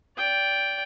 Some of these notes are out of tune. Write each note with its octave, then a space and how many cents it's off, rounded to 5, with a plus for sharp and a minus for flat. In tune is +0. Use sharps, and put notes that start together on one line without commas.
D5 -25 G5 +0